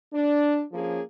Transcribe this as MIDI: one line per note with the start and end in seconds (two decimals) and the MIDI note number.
0.13 0.61 62
0.72 1.01 53
0.72 1.01 58
0.72 1.01 61
0.72 1.01 68